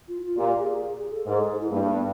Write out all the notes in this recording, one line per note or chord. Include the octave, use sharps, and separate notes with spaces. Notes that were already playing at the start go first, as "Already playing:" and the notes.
F4
F4
A#2 G4
G#4
G#4
A4
G#2 A#4
A4
G#4
E4
G2 A#3
A#3
B3